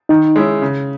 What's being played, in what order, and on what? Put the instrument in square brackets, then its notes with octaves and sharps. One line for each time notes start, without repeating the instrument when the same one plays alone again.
[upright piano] D#3 [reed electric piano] D#4
[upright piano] G#3 C#4 E4
C#3